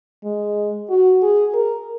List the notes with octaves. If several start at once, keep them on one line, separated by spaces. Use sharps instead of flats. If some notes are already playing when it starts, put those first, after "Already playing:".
G#3
F#4
G#4
A#4